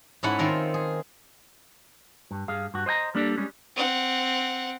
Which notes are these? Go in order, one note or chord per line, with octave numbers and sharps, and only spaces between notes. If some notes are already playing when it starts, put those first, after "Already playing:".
G#2 C#4 E4 A4 C#5 F#5
D#3 C4 F4 A4 A#4
G#4
G2
G2 G#4 F5
G2 F#4
C5 D#5 G5 A#5
G3 A#3 D4 A4 D5
G3 G#3 C#4
C4 F#5